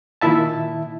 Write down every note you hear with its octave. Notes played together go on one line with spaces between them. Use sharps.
A#2 D#3 E4 E5 A5